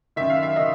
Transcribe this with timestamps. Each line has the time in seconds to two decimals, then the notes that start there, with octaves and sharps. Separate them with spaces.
0.16 F#2 D#3 E5
0.30 F5
0.43 E5
0.56 D#3 D#5